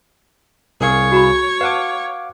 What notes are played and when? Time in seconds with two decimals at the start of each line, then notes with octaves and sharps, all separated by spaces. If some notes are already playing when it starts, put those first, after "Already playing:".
0.81 C2 G#4 A#4 C#5 F5 G#5
1.12 F#4 A#5 B5
1.61 B4 F5 F#5 A5 D6